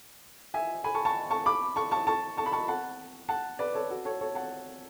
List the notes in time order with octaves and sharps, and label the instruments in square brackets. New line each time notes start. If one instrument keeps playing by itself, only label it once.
[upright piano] E5 G#5
G#5 B5
A5 C#6
A5 C#6
A5 C#6
B5 D6
A5 C#6
A5 C#6
A5 C#6
A5 C#6
B5
A5 C#6
F#5 A5
F#5 A5
B4 D5
A4 C#5
F#4 A4
A4 C#5
A4 C#5
F#5 A5